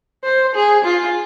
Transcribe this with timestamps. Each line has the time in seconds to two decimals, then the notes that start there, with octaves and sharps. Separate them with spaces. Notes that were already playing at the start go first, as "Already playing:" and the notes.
0.24 C5
0.55 G#4
0.85 F4